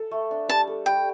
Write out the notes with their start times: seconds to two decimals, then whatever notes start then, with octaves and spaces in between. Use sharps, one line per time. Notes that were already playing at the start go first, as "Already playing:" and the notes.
Already playing: A4
0.11 A3
0.31 D4
0.49 G3 A5
0.67 A4
0.86 G3 G5